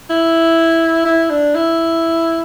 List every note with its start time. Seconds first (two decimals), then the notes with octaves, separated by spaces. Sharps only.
0.10 E4
1.05 E4
1.30 D4
1.55 E4